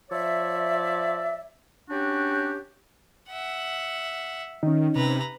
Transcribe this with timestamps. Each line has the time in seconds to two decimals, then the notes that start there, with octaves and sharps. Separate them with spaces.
0.11 F3 C#5 D5 E5
1.90 C#4 D4 F#4 G4
3.29 E5 F#5
4.63 D#3 C#4 D#4
4.96 C3 B4 A#5